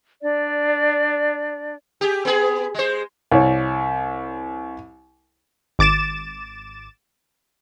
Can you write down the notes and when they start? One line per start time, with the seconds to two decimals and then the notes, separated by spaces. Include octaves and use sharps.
0.21 D4 D5
2.01 G4 G#4
2.25 B3 G#4
2.75 G#3 C5
3.31 C2 C#5
5.79 G#1 D6 A6 E7